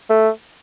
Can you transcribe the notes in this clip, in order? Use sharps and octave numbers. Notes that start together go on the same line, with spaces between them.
A3